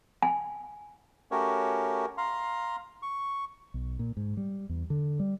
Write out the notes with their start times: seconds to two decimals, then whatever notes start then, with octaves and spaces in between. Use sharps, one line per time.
0.22 G#5
1.31 A3 C#4 F#4 G4 A#4 C#5
2.18 F5 A#5 C6
3.02 C#6
3.74 B1
3.99 A#2
4.17 G#2
4.37 G3
4.69 E2
4.90 D3
5.20 G3